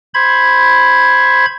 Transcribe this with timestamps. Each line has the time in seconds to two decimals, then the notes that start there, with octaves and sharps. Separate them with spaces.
0.14 C5 B5 G#6